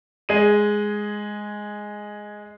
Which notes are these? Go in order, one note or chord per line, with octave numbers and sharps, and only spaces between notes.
G#3 G#4 D#7